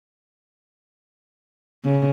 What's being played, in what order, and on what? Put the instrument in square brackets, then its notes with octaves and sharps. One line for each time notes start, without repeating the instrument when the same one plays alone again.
[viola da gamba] C#3